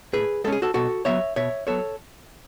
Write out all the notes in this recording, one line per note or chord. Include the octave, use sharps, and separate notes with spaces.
A2 G#4 B4
G#3 C#4 A4
G#4
F#4 A4
B2 F#4 A4
F#3 B3 C#5 E5
B2 C#5 E5
F#3 B3 A4 C#5